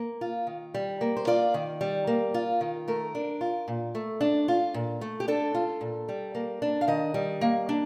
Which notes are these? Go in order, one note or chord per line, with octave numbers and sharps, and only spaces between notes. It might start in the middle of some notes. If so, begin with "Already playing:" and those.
Already playing: A#3
F4
D#3
G3
A#3
C5
F4 D5
D#3
G3
A#3
F4
D#3
A3 A#4
D4
F4
A#2
A3
D4
F4
A#2
A3
G4
D4 A4
F4
A#2
G3
A#3
D4
F5
D#3 D#5
G3
A#3
D4